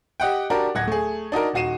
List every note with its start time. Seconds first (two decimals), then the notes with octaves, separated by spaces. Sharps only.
0.20 G4 D#5 F#5 G5
0.50 D4 F#4 G4 A#4
0.75 D1 F#5 G#6 A#6
0.88 A3 G#4
1.32 D4 D#4 F#4 A#4
1.54 D#1 D#4 F#4 C7 D#7 E7